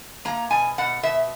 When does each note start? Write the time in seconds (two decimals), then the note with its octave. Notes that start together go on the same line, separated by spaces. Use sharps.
0.25 A#3 A#5
0.50 B2 G#5
0.78 B2 F#5
1.03 B2 E5